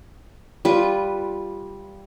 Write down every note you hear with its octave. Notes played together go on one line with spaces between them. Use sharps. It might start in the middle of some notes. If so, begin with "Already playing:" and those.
G3 F4 B4